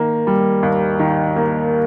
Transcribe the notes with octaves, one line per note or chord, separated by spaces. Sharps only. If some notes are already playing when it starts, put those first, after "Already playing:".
Already playing: D#3 A#3
G3
D#2
D#3
A#3